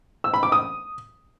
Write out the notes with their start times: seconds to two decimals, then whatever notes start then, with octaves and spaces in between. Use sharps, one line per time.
0.24 E6
0.34 B5
0.43 D6
0.52 D#6